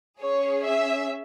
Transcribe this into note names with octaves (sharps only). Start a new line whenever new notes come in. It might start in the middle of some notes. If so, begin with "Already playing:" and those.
C#4 G#4 C#5
E5